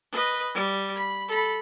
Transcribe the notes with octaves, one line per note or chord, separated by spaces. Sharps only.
B4 D#5
G3
B5
A4 B5